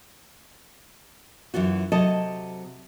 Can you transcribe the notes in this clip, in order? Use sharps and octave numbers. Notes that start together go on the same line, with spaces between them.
F#2 E3 F4 F#4
C3 F#3 A4 D#5 A5